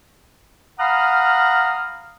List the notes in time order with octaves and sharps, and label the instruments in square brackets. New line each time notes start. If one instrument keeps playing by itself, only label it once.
[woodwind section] F5 F#5 A#5 B5 D#6 F6